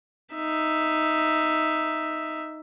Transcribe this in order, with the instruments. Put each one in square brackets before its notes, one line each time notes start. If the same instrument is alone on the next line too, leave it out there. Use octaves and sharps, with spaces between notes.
[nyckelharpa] D#4 E5